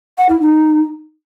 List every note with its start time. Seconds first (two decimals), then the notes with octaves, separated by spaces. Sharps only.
0.18 F#5
0.29 E4
0.40 D#4